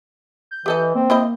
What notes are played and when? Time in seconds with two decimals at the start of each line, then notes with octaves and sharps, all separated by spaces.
0.51 G6
0.66 E3 G4 A4 D#5
0.95 A#3 C4
1.10 A#3 E4 C5 D#5